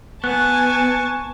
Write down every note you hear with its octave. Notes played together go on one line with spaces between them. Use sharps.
B3 G#5 A5 C#6 F#6